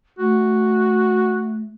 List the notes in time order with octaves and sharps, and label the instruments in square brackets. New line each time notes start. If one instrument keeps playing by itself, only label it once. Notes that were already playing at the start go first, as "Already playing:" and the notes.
[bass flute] A3 [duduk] F#4